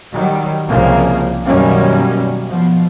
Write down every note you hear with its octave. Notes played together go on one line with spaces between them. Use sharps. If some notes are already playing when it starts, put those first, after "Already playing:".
D#3 F#3 G3
C2 C#3 F3 G3 A#3
F#2 B2 D#3 G3 A#3 C#4
B2 F3